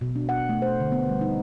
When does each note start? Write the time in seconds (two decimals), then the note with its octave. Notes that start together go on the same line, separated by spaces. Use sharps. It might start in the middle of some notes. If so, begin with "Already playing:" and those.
0.01 B2
0.16 D4
0.29 F#5
0.49 A3
0.62 C5
0.80 D3
0.92 B3
1.09 G3
1.21 D#4